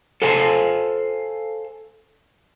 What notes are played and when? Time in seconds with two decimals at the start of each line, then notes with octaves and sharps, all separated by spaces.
0.22 A4 C5 F5 G#5